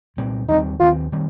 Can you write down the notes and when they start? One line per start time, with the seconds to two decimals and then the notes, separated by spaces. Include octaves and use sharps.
0.17 C2 A#2 G3 C4
0.48 D#2 D#3 G3 C4 D#4
0.80 D#2 D#3 G3 C4 F4
1.12 D#3 G3 C4